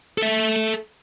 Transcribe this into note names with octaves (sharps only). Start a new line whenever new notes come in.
A4 E5